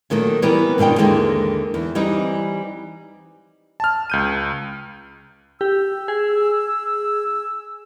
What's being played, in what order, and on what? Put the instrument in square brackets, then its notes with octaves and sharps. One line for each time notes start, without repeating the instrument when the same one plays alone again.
[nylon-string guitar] A#2 D#3 F#3 A3
E3 G3 B3 C4 A#4 B4
G#2 B2 D#3 D4 G5
D#2 D3 E3 G#3 A#4
E2
E3 G3 C4 D#4
[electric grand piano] A5 F6
C#2 G6 D#7
[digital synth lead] G4 [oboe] E6
[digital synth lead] G#4